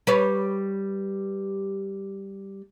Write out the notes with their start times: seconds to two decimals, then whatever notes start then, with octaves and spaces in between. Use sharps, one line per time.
0.07 G3 B4 C#5